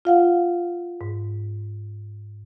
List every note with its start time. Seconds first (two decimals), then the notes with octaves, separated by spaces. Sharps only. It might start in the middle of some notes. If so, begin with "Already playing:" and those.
0.05 F4 F5 F#5
1.01 G#2